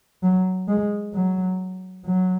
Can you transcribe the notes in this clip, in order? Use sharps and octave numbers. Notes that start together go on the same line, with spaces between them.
F#3
G#3
F#3
F#3